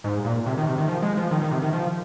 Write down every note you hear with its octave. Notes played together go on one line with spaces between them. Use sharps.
G#2
A#2
C3
D#3
C3
D#3
F3
G#3
F3
D#3
D#3
C3
D#3
F3